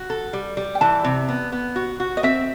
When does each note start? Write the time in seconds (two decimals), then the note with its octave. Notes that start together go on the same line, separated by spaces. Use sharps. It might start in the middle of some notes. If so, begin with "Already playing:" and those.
Already playing: F#4
0.10 A4
0.33 G3
0.57 G3
0.75 G5
0.81 E3 A5
1.04 C3
1.28 B3
1.52 B3
1.76 F#4
2.00 F#4
2.17 D#5
2.23 C4 E5